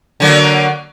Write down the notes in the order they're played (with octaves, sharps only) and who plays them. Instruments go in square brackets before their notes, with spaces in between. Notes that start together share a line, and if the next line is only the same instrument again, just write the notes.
[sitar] D3 F#3 A#3